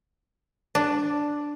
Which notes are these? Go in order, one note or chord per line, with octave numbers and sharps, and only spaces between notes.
D4